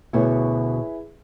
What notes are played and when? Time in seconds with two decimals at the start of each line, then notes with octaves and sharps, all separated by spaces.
0.13 D2 B2 E4 G#4 B4 C#5